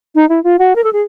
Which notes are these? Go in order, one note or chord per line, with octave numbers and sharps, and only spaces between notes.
D#4
E4
F4
F#4
A#4
A4
G#4